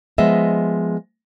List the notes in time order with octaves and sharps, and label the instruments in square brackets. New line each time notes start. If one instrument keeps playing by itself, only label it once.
[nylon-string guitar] F3 G#3 B3 D#5 E5